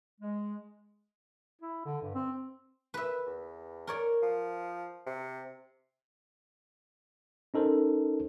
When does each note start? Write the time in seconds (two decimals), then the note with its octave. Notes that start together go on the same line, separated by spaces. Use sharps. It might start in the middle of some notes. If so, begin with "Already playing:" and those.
0.21 G#3
1.62 E4
1.85 D3
2.02 G2
2.14 C4
2.94 B4 E5
3.26 E2
3.87 A#4 C#5 D5
4.22 F3
5.06 C3
7.54 C#4 D#4 A4 A#4 C5